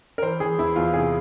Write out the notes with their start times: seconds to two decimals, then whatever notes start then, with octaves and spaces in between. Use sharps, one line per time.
0.18 A#4
0.22 E3 C5
0.40 E3 G#4
0.58 E2 E4
0.76 E2 F4
0.94 C3 G#4